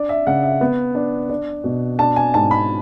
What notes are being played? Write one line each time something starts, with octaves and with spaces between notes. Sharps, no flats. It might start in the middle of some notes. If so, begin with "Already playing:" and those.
Already playing: D4 D5
E5
C#3 F#5
E5
B3
D4
D4
B2
D4 A5
G#5
G#2 A5
B5